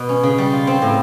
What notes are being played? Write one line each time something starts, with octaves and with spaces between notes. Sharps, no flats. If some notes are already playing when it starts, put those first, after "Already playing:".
Already playing: B2 B3
C#4
C#3
G3
F4
C4
A2